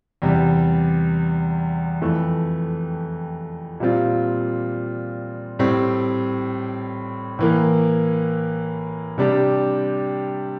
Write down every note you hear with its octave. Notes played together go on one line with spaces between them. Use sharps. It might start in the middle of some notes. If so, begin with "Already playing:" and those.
E2 C3 G3
F2 E3 A3
A#2 G3 C4 F4
A2 G3 C4
A2 E3 A#3
C3 G3 D4 G4